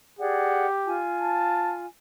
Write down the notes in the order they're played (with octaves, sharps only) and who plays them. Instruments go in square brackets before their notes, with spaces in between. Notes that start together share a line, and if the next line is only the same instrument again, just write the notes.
[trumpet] G4 [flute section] G#4 D5 F#5
[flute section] F4 G#5
[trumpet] A5